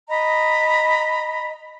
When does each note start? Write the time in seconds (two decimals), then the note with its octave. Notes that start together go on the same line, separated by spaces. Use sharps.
0.08 D#5 A#5 B5